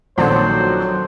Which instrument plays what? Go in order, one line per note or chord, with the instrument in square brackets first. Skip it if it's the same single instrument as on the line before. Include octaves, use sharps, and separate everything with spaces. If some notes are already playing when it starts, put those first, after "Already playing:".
[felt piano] A#1 D#3 [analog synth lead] F#3 [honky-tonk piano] C4 D4 A4 [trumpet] C5